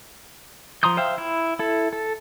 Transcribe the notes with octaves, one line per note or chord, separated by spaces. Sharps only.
F3 A#5 C6 D#6 G6
C5 E5 F5 G5
E4
E4 A4
A4